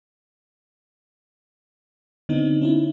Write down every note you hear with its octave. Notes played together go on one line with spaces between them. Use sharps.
D3 B3 C4 D4 D#4
C#4 D#4 E4